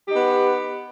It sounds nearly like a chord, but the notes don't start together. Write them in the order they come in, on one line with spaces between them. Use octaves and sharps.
G4 D#4 B3